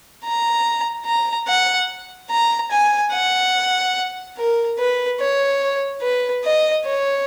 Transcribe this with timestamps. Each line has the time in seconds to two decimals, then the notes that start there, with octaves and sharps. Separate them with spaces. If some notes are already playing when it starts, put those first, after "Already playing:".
0.24 A#5
1.06 A#5
1.47 F#5
2.31 A#5
2.71 G#5
3.12 F#5
4.37 A#4
4.79 B4
5.20 C#5
6.02 B4
6.44 D#5
6.85 C#5